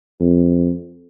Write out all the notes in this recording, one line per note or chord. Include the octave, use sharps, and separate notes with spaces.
F2